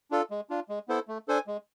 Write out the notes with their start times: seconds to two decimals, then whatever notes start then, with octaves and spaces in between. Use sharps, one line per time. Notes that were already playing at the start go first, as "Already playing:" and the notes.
0.11 D4 F4 A4
0.31 G#3
0.50 D4 F4
0.69 G#3
0.88 B3 E4 A4 C5
1.08 A3
1.28 D4 A4 C5 G#5
1.47 G#3